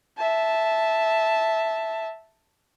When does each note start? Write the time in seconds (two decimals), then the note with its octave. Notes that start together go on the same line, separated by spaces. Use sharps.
0.18 E5 A5